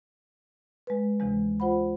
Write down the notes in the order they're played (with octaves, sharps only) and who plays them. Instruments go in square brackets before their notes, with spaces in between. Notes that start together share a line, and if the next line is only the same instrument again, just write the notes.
[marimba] G#3 B4
D2 C3 E3 G#3
F4 C5 F#5 B5